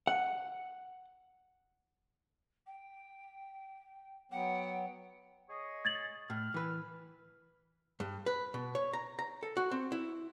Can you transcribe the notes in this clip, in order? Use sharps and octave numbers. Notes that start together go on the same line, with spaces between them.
F#5
G5
F#3 B3 F#5 G5
G#4 C#5 D#5
G#6 A6 F#7
A2 F6
E3 B4
G2
B4
B2
C#5
A#5
A#5
A4
F#4
C4
E4